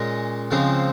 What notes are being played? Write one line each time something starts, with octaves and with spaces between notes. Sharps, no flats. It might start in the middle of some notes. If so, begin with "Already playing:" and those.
Already playing: A#2 G#3 C#4 D#5
C#2 C#3 F3 G#3 C4 F5